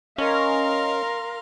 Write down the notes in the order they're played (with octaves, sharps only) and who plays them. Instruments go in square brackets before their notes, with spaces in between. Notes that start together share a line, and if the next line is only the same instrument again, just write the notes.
[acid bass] C#4 [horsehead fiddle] A#4 [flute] D#5 [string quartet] F5 A#5 C6